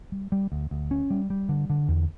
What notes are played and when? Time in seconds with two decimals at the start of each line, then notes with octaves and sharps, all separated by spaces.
0.12 G3
0.32 G3
0.52 D2
0.71 D2
0.91 C#4
1.11 G3
1.30 G3
1.49 D3
1.70 D3
1.88 E2